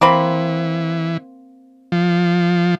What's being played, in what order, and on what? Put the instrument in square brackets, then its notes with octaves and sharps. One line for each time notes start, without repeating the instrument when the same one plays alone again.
[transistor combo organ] E3 [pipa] A#3 C4 B5
[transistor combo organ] F3